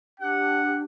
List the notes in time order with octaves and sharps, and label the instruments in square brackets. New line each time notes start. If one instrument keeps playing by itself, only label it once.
[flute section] D4 G4 [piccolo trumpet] F#5